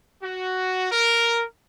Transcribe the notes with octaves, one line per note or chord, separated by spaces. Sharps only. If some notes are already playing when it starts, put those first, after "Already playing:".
F#4
A#4